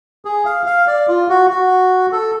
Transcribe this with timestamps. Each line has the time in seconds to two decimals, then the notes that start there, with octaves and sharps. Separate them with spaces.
0.25 G#4
0.45 F5
0.66 F5
0.87 D5
1.08 F4
1.29 F#4
1.50 F#4
2.12 A4